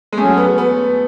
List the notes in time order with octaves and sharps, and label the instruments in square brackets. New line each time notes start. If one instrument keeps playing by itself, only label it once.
[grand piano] G#3
[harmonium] F#3 C#4 G#4 [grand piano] A3
[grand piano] B3
B3